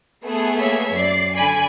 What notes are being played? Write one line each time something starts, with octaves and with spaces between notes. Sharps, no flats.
A3 B3 G#4
A#3 C#5 E5
F#2 D5 C7
D3 D5 G#5 B5